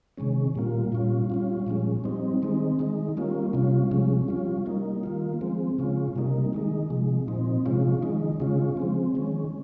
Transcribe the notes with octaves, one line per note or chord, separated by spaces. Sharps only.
C3 D#3 G#3 C#4
A#2 G3 A#3 F4
A#2 G3 C#4 F4
G3 C#4 F4
A#2 F3 G#3 C#4
G3 C4 D#4
D#3 G#3 C4 D#4
D#3 G#3 D#4
G3 A#3 C#4 F4
C3 G3 C#4 F4
C3 F3 G#3 C#4
G3 C#4 F4
G3 A#3 D#4
D#3 A#3 F4
F3 G#3 C4
C#3 G#3 C#4 F4
C3 G3 A#3 D#4
D#3 G#3 D#4
C3 F3 G#3
A#2 F3 C4 D#4
C3 F3 G#3 C#4 F4
D#3 G#3 D#4
C#3 G#3 C#4 F4
F3 G#3 C4
D#3 G#3 C#4